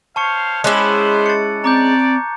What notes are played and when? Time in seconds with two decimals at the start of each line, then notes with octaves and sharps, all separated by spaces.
0.16 C5 C#5 F5 A5 C#6 C#7
0.64 G#3 B3 C#4 E4 C5 D6 F#6
1.26 A6 C#7
1.64 C4 D5 A#5 D6 G6